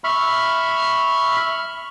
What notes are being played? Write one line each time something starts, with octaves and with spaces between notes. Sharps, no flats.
E5 B5 C#6 F6